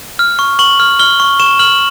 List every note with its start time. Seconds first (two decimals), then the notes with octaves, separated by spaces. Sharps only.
0.19 F6
0.39 C#6
0.59 C#6 F#7
0.80 F6
0.99 F6 G7
1.20 C#6
1.40 C#6 E7
1.59 F6 F#7